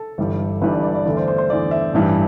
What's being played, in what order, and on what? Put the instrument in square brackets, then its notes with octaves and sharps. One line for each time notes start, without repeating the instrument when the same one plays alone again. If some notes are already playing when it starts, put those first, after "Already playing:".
Already playing: [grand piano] A4
G1 G2 E3 G3
G1 G2 E3 G3 B4
D5
D5
D5
E2 D3 A3 D5
C5
C5
C5
E2 D3 A3 D5
E5
A1 G2 E3 G3